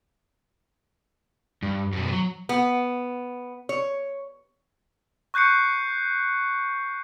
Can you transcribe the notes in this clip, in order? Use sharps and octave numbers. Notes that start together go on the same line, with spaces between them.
G2
F#2 B2
F3 F#3
B3
C#5
C#6 F#6 G6 C7 C#7